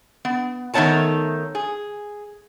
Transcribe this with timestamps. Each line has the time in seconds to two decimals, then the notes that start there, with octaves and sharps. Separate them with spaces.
0.25 B3
0.74 D#3 A3 B3 C#5 A5 A#5
1.55 G#4